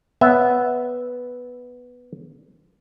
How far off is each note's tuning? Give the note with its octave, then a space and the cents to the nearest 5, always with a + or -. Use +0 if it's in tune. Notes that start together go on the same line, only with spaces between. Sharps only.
B3 +0 C#5 +0 E5 -10